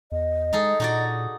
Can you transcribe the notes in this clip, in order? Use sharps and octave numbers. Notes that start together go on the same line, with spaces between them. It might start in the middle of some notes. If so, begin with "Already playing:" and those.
E2 D#5
G#3 D#4 G#4 A4
A#2 D#4 F#4 D5